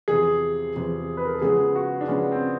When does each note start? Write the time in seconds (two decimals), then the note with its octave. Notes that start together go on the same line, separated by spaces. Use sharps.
0.08 E2 C3 F3 G#4
0.76 E2 C3 F3
1.17 B4
1.25 A#4
1.34 A4
1.42 C#3 F3 G#3 B3 G#4
1.75 F#4
2.01 D4
2.08 C#3 F3 G#3 B3 C#4
2.32 C4